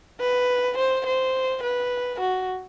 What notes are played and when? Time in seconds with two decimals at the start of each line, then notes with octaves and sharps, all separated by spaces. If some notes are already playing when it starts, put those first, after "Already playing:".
0.20 B4
0.78 C5
1.06 C5
1.63 B4
2.20 F#4